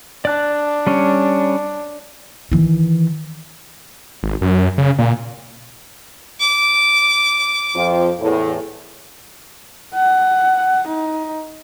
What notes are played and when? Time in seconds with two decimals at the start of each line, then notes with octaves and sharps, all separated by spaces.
0.25 D4 D5 F#6
0.87 G3 C#4 C#5
2.52 D#3 E3
4.23 G#1
4.41 F#2
4.78 C#3
4.99 A#2
6.40 D6
7.75 F2 F3
8.20 E2 A2
9.94 F#5
10.88 D#4